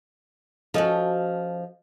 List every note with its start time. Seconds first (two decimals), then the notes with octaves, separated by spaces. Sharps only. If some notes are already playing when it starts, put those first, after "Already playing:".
0.74 F3 C#4 F#4 A4 D#5